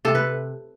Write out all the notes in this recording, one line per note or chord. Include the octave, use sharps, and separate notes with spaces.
C3 A4
B4